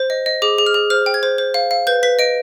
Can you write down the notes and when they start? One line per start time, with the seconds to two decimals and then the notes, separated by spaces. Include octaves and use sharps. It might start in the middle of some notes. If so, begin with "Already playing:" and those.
Already playing: C5
0.10 D#5
0.26 D#5
0.42 G#4 D6
0.58 G#4
0.66 F6
0.74 G#4
0.90 C5 F6
1.06 G5
1.14 G#6
1.23 C5
1.38 C5
1.54 F5
1.71 F5
1.87 B4 G6
2.03 B4 B6
2.19 D#5 D7